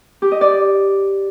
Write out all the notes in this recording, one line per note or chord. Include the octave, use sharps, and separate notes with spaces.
G4
D#5
D5